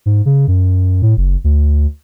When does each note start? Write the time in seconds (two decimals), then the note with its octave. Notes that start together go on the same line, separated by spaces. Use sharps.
0.06 G#2
0.26 C#3
0.48 F#2
1.02 A2
1.17 F#1
1.44 D2